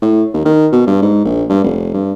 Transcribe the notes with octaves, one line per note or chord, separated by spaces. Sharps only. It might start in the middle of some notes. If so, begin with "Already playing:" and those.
A2
D#2
D#3
B2
G2
G#2
A#1
G2
F1
G2